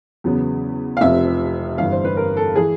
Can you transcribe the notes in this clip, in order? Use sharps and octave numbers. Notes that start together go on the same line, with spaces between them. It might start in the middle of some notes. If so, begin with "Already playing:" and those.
E2 C#3 F#3 B3
F5
F1 F2 C3 F3 E5
G1 G2 E3 F5
C5
B4
A#4
A4
E3 G#4